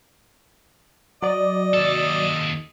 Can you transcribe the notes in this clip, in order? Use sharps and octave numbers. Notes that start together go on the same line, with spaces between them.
F#3 D5 D#5
D#2 A4